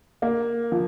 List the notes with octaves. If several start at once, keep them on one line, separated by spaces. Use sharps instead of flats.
A#3
F3